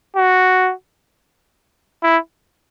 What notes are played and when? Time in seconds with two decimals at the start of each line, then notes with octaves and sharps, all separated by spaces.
0.16 F#4
2.03 E4